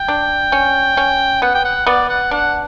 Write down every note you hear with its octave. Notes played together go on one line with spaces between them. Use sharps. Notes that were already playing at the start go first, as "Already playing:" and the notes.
Already playing: G5
D4
C#4
C#4
B3 F#5
G5
F#5
B3 D5
F#5
D4 F#5